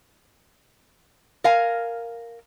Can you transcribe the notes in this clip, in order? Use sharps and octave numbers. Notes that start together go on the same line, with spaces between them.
A#4 F5 G#5